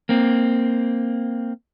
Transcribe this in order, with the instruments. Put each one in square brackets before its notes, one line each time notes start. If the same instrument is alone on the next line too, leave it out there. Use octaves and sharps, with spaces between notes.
[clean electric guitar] A#3 C4